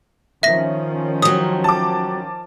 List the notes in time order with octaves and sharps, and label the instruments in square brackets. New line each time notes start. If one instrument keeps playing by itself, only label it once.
[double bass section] D#3 F3 C#4 [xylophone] E5 A#6
[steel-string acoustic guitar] F#3 G3 [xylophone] D#6
[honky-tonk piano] A5 D6